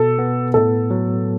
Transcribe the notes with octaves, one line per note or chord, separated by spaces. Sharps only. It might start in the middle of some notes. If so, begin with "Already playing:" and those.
Already playing: B2 A4
B3
A2 A4
F#3